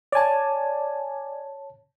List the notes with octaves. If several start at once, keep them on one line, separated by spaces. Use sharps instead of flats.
C#5 D5 G#5 A5